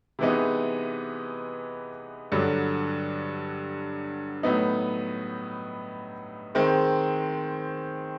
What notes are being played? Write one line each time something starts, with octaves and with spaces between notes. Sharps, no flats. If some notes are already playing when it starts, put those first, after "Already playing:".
C3 E3 G#3 B3 D#4
G2 D3 F#3
A2 F#3 B3 D#4
D#3 G#3 C4